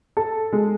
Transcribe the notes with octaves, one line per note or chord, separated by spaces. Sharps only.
A4
G#3